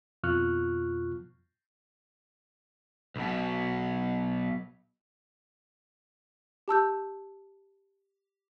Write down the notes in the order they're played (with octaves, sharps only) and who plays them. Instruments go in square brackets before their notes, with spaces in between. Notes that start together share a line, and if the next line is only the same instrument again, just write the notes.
[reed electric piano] F2 B2 F4 C#6 F6 F#6
[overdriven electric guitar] B1 B2
[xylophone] G4 A5 E6 G6